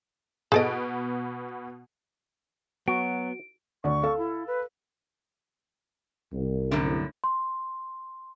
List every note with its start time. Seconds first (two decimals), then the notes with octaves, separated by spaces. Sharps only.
0.52 B2 B3 G#4 A4 D#5 D7
2.88 F#3 B3 F#4 D7
3.84 D2 D5 C#6
4.03 A4 F5
4.18 E4
4.47 B4
6.33 C2
6.71 F#2 A2 D3
7.24 C6